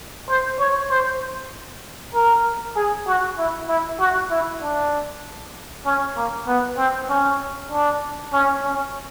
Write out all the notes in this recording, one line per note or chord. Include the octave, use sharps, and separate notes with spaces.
C5
C#5
C5
A#4
G#4
F#4
E4
E4
F#4
E4
D4
C#4
A#3
B3
C4
C#4
D4
C#4
C#4